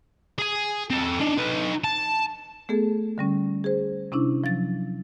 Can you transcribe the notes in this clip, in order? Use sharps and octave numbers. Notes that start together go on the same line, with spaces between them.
G#4 G#5
C4 A4
D4 D#4
D#4 B4
A5
A3 B3 G#4 A4
D3 G3 C#4
G#4 C5
C3 C#4 D4 E4
F3 F#3 A6